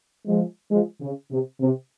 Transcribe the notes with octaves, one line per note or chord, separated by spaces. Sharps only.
F3 G#3
F3 G#3
C#3
C3
C3